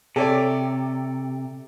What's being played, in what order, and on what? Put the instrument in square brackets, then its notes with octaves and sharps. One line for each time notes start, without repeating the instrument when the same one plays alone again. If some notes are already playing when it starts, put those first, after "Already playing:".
[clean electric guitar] C3 [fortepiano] A4 C#5 D5